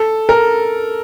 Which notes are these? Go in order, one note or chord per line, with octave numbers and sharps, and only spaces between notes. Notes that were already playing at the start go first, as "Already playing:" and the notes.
Already playing: A4
A#4